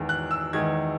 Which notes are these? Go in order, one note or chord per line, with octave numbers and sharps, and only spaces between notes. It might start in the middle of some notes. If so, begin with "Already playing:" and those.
Already playing: E2 D#3 G#3
F#6
E6
E2 D#3 G#3 G#6